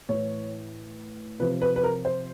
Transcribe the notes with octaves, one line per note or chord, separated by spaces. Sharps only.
A2 E3 C#5
C3 F3 B4
B4
B4
A#4
C5